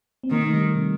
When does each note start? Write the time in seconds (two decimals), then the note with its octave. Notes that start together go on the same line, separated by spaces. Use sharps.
0.23 C4
0.30 D#3 A#3
0.42 A3
0.53 G3
0.75 C3